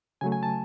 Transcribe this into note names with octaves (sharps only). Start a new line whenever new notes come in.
C#3 F#3 A3 G#5
G#5
A5